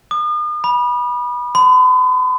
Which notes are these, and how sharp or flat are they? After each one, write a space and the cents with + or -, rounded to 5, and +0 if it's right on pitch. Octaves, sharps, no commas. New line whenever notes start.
D#6 -40
B5 -20
B5 +45